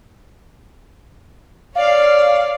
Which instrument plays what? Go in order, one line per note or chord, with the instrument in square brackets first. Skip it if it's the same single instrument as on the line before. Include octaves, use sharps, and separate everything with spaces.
[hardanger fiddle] C#5 D5 [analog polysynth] F5